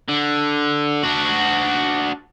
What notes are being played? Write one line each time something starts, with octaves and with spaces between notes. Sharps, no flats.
D3
D4 F#4